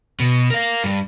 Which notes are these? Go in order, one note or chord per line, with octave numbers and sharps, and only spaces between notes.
B2
A#4 F5
G2